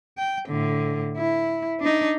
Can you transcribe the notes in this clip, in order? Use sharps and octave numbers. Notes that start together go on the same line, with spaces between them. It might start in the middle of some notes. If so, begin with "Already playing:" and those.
G5
A2 D3
E4
D4 D#4